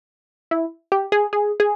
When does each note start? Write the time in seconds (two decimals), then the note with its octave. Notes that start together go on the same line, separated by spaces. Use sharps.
0.51 E4
0.92 G4
1.12 G#4
1.33 G#4
1.60 G#4